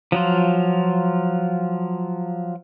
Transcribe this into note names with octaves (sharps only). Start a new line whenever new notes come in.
F3 F#3 F4